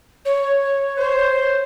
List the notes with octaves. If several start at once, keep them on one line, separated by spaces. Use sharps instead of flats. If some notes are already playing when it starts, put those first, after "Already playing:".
C#5
C5